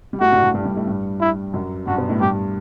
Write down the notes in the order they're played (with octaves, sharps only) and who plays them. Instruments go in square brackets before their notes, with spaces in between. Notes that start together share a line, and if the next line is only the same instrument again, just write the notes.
[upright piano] G3
[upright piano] A2 A3 [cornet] F#4
[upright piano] G2 G3
G2 G3
G2 G3
G2 G3
A2 A3
G2 G3
[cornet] E4
[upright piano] F#2 F#3
[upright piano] G2 G3 [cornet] F#4
[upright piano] B2 B3
A2 A3
[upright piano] G2 G3 [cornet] G4